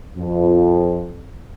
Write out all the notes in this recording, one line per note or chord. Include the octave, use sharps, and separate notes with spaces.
F2